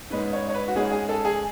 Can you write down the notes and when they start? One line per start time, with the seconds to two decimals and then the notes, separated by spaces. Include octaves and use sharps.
0.10 G#2 G#3 C#4 B4
0.33 C#5
0.48 C#5
0.54 B4
0.68 F#4
0.76 G#2 G#3 C#4 G#4
0.91 G#4
1.09 A4
1.25 G#4